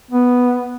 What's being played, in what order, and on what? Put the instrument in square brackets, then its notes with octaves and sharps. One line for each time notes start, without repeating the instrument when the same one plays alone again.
[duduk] B3